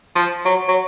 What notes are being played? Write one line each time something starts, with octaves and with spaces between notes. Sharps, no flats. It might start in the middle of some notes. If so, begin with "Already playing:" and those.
F3
F#3
F#3